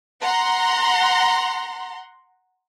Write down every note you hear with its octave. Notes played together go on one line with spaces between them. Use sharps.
F#5 A#5 C6